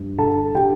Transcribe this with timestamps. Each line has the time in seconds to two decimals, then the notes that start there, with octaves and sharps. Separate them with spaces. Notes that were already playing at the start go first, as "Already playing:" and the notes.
Already playing: G2
0.18 D3 A4 A5
0.55 D3 G4 G5